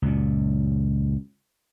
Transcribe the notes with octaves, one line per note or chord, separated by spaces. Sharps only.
C#2 F#2 A#2